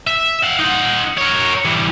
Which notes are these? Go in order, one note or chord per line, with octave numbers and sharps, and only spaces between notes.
E5
F5 F#5
D#4 F#5
A#4 C#5
E3 G3